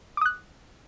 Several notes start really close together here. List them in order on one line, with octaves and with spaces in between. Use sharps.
D6 D#6 F#6